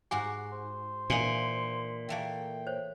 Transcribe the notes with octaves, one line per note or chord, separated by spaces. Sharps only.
G#2 F#4 G4 G#5 C6 D6
C5
A#2 E3 A#3 D4 D#4 G#5
E3 A3 A#3 G5
C5 C#5